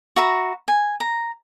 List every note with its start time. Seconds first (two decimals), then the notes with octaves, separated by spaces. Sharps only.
0.16 F#4 E5 A#5 B5
0.68 G#5
1.00 A#5